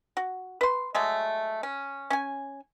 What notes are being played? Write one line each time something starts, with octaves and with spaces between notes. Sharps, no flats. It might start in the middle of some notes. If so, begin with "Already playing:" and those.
F#4
B4 C6
F#3 G#3 A3
C#4
C#4 G#5